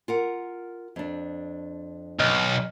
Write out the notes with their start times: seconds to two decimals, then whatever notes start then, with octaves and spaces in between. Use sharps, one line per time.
0.08 F4 A#4 F#5
0.96 F2 D4
2.20 B1 D#5 F6